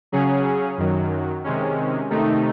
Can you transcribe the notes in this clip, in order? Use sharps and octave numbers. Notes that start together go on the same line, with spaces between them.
C#3 F#3 C#4 G#4
F#2 D#3 F#3
C3 D#3 G#3 C#4
C3 D#3 A3 D#4